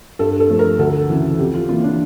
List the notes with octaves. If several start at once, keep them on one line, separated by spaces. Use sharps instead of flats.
G2 A4
A4
F3 A3
A#4
D2 A4
C#3 E3
F2 G4
F4
E3 A#3 F4
D4